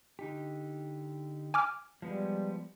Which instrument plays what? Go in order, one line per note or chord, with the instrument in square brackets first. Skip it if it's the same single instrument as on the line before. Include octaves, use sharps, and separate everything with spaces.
[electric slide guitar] D3 D#4 G4
[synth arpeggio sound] G#5 D6 F6
[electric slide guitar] F3 G#3 B3 [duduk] G3